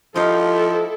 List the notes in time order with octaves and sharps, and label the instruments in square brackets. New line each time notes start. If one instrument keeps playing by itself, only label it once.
[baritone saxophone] F3 [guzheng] D#4 G4 F5 [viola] E4 A4